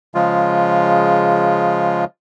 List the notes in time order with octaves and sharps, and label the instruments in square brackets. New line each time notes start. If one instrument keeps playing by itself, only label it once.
[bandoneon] C#3 F3 G#3 F4